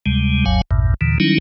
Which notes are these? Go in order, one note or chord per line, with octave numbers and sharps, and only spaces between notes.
D2 C3 G3 G#3
F#1 D2 G2 F#3 F5 G#5
A1 E2 G2 A#2
D#2 A#2 D3 E3
D#3 F#3 G3 C#4 D#4 E4